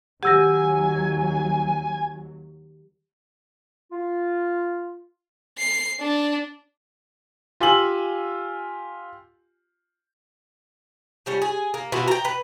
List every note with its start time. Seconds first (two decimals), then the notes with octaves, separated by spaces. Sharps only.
0.23 D#2 F#3 G4 F#5 G#5 E6 A#6
3.91 F4
5.58 C7
6.00 D4
7.60 F4 G4 G#5 E6 F#7
11.26 F3 G3 C#4
11.42 G#4
11.74 A#3
11.92 B2 E3 F4 F#4
12.08 G5 A#5
12.25 B4